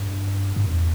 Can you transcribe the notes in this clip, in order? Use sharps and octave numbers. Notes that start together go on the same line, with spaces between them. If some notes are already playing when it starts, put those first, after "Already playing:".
Already playing: G2
G2
E2